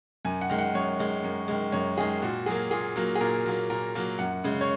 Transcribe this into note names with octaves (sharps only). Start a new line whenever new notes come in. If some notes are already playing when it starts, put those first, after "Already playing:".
F#2 G#5
F#5
D#3 G#3
F#5
F#2 C#5
D#3 G#3
F#2
D#3 G#3
F#2 C#5
D#3 G#3 G#4
A#2 F#4
F#3 A#3 G#4
A#2 G#4
F#3 A#3
G#4
A#2 A#4
F#3 A#3
A#2 A#4
F#3 A#3
F#2 F#5
C#3 G#3
C#5